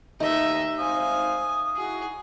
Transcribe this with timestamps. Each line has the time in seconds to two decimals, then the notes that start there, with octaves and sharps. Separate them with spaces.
0.20 D#2 A3 D#4 D#5 E5
0.79 G#1 C5 F5 G#5 D#6
1.76 D#4 E4 F#4 G#4